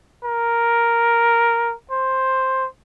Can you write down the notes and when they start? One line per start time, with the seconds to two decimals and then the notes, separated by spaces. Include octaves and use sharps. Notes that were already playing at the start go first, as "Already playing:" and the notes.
0.24 A#4
1.92 C5